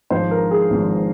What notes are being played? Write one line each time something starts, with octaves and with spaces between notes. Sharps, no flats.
G#1 G#2 F3 C5
A#4
G#4
G#1 G#2 F3